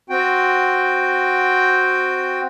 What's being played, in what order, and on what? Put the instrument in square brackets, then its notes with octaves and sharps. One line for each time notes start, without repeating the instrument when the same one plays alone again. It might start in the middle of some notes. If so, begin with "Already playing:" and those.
[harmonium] C4 F#4 G5